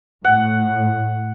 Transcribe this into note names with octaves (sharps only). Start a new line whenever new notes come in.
A2 F#5